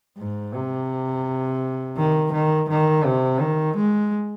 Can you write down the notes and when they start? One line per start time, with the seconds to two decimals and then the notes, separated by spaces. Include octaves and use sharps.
0.18 G#2
0.54 C3
1.98 D#3
2.33 D#3
2.70 D#3
3.05 C3
3.40 D#3
3.76 G#3